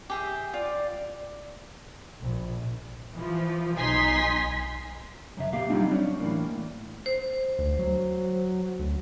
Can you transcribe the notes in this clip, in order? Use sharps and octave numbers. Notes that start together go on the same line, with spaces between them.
G4 G#4 E5
F4 D5
A#1
E3 F3
B1 D#4 G#5 C6 B6
F#2 C#3 E5
A#2 A#3 G4 F5
F#3 G3 C4 D4 D#4 F4
C#4 D4
A2 E3 A#3
C5
D2
F#3
D2